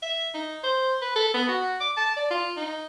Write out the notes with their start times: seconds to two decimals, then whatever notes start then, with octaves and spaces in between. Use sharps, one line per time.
0.02 E5
0.34 D#4
0.63 C5
1.01 B4
1.16 A4
1.34 B3
1.48 F#4
1.80 D6
1.97 A5
2.16 D5
2.30 F4
2.57 D#4